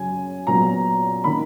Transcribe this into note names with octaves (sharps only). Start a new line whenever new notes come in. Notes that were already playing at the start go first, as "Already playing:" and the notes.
Already playing: F#2 C#3 F#3 G#5
A#2 F#3 B3 A#5
D#3 A#3 B5